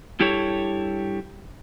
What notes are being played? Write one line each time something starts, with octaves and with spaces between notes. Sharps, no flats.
G2 E4 G4 A4 C#5